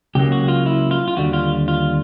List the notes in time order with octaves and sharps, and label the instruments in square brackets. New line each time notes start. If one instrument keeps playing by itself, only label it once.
[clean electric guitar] C#2 C#3 F#3 A#3 G4
F#4
F4
E4
F4
F4
D#2 D3 G3 F#4
F4
F4